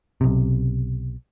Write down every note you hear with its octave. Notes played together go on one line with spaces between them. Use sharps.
B1 C3